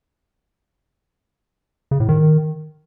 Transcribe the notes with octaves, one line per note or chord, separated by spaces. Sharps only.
C#3
A2
D#3